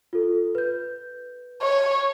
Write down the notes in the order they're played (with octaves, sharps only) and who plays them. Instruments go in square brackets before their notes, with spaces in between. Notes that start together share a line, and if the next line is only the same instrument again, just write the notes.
[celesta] F4 A4
B4 G6
[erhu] C#5